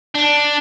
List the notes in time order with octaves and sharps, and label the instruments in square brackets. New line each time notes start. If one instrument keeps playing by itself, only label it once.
[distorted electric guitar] D4